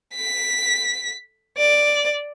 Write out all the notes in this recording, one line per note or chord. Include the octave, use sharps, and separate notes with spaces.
B6
D5